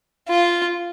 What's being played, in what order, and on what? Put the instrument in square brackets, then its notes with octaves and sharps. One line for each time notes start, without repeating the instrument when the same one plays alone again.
[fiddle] F4